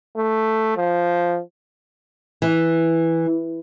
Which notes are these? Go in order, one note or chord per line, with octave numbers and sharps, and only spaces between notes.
A3
F3
E3